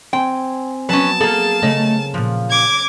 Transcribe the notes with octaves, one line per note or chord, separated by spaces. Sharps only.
C4 G5 G#5
F#3 B3 C#4 B4 A5
A#3 G#4 A4 F5 A6
C#3 A3 C#5 D#5
A#2 F3 F#6
D6 G#6